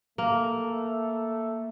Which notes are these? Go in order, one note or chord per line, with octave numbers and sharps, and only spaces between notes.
A3 A#3